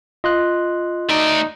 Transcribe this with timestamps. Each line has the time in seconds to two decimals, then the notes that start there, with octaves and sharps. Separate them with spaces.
0.24 F4 D#5 C6 F#6
1.09 A3 D#4 D5